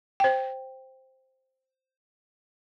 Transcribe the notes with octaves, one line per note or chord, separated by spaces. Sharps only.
C5 G5